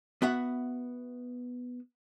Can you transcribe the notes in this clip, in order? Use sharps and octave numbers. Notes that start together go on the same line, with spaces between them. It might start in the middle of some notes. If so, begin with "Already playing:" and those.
B3 F#4 E5 F#5